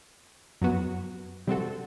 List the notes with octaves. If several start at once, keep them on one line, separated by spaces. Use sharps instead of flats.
F#2 F#3 B3 F#4
C3 G3 C4 F#4 A4